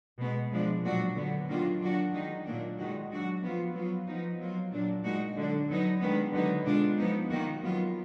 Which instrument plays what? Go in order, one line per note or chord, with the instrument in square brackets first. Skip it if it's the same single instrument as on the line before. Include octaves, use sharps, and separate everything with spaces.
[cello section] B2 G#3 B3
F3 G#3 D4
A#2 F#3 D4 F#4
D3 F#3 B3
D#3 F#3 A#3 D4 F4
F#3 D4 F#4
D#3 G#3 D#4
A#2 F#3 A#3 D4
D#3 G#3 D#4 F#4
F#3 D4 F#4
F3 B3 F4
F#3 B3 F4
F3 B3 D#4
F#3 A#3 F4
A#2 F#3 D4
A#2 G#3 D#4 F#4
D3 F#3 D4
F#3 B3 D#4
D#3 G#3 B3 D4
D3 F#3 B3 D#4
B2 G#3 D4 F4
F3 B3 D#4
D#3 A#3 D#4 F#4
F#3 B3 F4